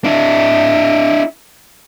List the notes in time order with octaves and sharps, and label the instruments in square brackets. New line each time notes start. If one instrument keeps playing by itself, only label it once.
[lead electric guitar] D4 E4